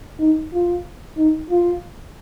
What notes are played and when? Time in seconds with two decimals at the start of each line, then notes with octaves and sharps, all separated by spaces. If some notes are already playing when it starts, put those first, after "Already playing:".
0.19 D#4
0.53 F4
1.17 D#4
1.50 F4